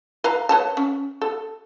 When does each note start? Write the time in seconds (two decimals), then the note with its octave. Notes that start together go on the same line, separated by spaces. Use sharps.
0.24 B4 F5 A#5
0.49 B4 C#5 A5
0.77 C#4
1.21 A4